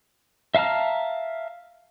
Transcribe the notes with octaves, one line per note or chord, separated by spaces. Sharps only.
E5 F5 A5 A#5 F6